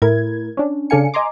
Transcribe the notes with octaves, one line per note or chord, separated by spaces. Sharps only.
A2 E4 A#4 G#6
C#4 D4
C#3 D4 A4 F5 G#5 C#7
D#5 G#5 A#5 C6 D6